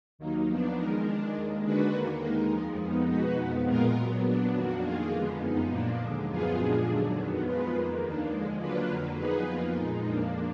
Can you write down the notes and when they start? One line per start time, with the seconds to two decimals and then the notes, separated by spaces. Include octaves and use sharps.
0.19 D#2 D#3 F#3 A#3 D#4
0.48 F3 B3 D4
0.76 D#3 G#3 D#4 A#4
1.05 D#3 G#3 D4
1.35 D#2 D#3 G#3
1.64 D3 G#3 D4 F#4 B4
1.93 D#2 D#3 A#3
2.22 D#2 D#3 G#3 D#4 A#4
2.51 F2 F3 G#3
2.79 F2 F3 B3 D#4
3.08 B2 G#3 D#4 F#4 B4
3.38 F2 F3 B3
3.67 A#2 G#3 B3 F4 A#4
3.95 A#2 F#3 B3
4.24 F#3 B3 D4
4.54 F2 D#3 A#3 D4 F#4
4.83 F2 D#3 A#3 F4 G#4
5.11 F2 D3 F3 G#3 B3
5.41 F#2 F3 B3 D#4
5.70 A#2 F3 A#3 D4
5.99 D#2 D3 G#3
6.28 F#2 F3 B3 F4 G#4
6.57 A#2 F3 G#3 D4 G#4
6.86 D#2 D3 F#3 D4
7.15 F2 D#3 F#3 B3
7.44 F3 G#3 B3 F4 B4
7.73 F2 D#3 A#3
8.02 D#2 D#3 A#3 D4
8.31 D3 F3 G#3
8.60 F#3 A#3 D4 F4 B4
8.88 F2 D3 F#3 A#3
9.17 F3 B3 D#4 G#4 B4
9.47 F2 F3 A#3 F4
9.76 A#2 G#3 D#4
10.05 F2 F3 A#3 D4